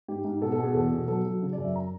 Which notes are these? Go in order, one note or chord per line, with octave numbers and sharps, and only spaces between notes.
G#2 G4
G#2
B2 A4
A4
B2
G#4
E2 A4
B2
F#3 A4
F#3
C#3
D5
F#2
E5
A#5